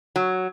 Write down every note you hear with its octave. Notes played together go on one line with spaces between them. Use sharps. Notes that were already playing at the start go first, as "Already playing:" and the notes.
F#3